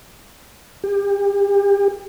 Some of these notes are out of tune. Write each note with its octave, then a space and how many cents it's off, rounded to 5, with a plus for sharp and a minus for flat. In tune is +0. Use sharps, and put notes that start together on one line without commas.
G4 +35